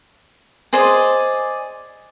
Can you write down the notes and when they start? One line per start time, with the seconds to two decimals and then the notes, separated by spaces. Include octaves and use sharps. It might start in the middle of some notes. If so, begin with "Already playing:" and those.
0.73 G#4 C5 D5 D#5